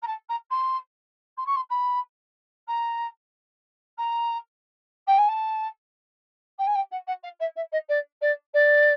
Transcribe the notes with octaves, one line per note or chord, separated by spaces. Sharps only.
A#5
A5
A#5
C6
C6
C#6
C6
B5
A#5
A#5
G5
G#5
A5
G5
G#5
G5
F#5
F#5
F5
E5
E5
D#5
D5
D5
D5